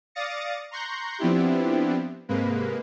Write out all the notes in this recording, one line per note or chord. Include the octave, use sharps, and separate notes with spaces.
D5 F5 D#6 A6 A#6 C#7
A#5 C6 C#6 F#6 G6 A#6
F3 B3 C4 D4 E4 G4
G#2 C3 G#3 A#3 B4